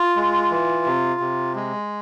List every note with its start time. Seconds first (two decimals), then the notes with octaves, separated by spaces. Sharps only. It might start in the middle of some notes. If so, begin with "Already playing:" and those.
Already playing: F4
0.16 G#3
0.51 E3
0.85 C3
1.20 C3
1.55 G#3